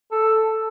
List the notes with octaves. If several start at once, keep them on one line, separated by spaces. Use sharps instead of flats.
A4